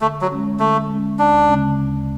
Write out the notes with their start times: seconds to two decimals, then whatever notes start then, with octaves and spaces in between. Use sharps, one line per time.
0.01 D3 A3
0.21 F#3
0.31 G#3 C#4
0.60 D3 A3
0.89 G#3 C#4
1.19 D2 D4
1.49 C#3 G#3 C#4
1.78 D2